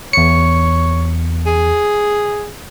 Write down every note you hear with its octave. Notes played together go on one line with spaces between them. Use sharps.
E2 C#5 C#7
G#4